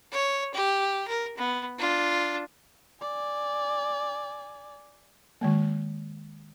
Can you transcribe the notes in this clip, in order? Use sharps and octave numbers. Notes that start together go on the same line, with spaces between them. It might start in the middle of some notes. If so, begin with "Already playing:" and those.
C#5
G4
A#4
B3
D4 F4
D5 G#5
D#3 G#3 A#3